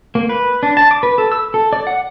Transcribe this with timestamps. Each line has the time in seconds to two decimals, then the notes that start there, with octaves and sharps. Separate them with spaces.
0.15 A#3
0.29 B4
0.63 D4
0.77 A5
0.91 D6
1.03 B4
1.18 A4
1.32 E6
1.54 A4
1.73 D5
1.87 F#5